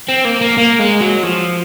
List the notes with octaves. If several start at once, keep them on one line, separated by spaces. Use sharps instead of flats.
C4
A#3
A#3
A#3
G#3
F#3
F3